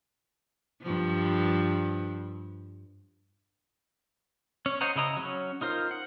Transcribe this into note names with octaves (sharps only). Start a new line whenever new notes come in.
G2 F3
C#4 C#5
C5 C#5 D#5 F#5 A#5
C#3 E4 D#5 A#5
F#3 C#4
D#4 F4 A#4 C5
F#5